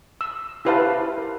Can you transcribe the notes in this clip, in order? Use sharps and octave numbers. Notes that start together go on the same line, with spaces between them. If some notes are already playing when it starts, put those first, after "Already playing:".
E6
E4 G4 B4 C5 F5 A5
A#4